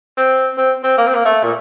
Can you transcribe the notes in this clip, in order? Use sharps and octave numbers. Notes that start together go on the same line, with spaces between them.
C4
C4
C4
A#3
C4
A#3
A3
A#2